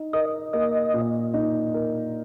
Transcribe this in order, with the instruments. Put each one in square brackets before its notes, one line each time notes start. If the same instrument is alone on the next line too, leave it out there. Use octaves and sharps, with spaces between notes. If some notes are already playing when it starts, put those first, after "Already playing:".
Already playing: [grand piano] D#4
[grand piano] A#4 [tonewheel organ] D#5
[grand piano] A#3 [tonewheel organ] D#5
[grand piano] A#2
D#4
A#4